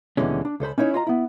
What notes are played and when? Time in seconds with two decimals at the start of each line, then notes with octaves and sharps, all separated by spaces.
0.17 D#2 B2 D3 E3 G#3 C#4
0.45 D4
0.60 C#2 A4 C5 B5
0.78 C#4 D#4 E4 C#5
0.94 F4 D#5 A#5
1.07 B3 E4